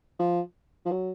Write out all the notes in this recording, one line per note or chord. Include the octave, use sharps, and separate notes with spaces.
F3
F3
F#3